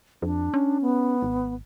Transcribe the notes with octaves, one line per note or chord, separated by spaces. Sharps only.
F2 D4
C#4
B3
G#1